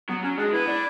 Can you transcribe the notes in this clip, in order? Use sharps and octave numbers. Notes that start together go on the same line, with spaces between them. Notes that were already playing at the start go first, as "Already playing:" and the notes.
F#3 B3
F#3 C#4
G#3 D4
B3 E4
D4